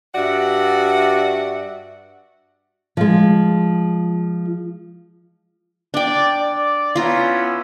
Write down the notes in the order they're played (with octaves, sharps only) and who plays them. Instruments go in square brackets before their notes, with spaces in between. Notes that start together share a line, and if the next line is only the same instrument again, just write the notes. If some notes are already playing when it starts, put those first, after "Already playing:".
[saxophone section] G2 F#4 D5 E5 F#5
[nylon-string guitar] F3 G#3
[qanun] D4 G5 [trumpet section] D5
[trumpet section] D5
[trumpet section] B3 C#4 E4 [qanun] F4 A#5